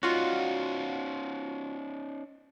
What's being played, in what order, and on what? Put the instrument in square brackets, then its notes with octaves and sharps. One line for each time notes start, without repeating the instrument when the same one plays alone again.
[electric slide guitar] C#4 D#4 [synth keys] F4 F#4